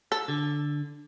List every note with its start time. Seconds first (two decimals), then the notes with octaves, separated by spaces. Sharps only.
0.12 A4
0.28 D3